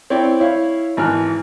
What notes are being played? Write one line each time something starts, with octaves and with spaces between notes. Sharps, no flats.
C4 E4 C#5 D5 G5
E4 C#5 F5
G#1 E3 F6 F#6